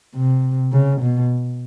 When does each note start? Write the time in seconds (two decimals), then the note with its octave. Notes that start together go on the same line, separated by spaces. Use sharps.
0.15 C3
0.72 C#3
1.01 B2